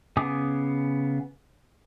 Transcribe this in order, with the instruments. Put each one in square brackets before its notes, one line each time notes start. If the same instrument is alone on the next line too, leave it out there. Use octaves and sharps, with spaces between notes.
[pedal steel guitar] C#3 B3 G#5 D6 D#6